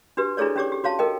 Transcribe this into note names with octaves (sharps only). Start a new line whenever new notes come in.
D4 F#4 G4 B4
D4 E4 G#4 A4 C#5 D5
C#4 D4 G4 C#5 D6
G4
F#4 C#5 F5 A5
A4 A#4 D#5 G5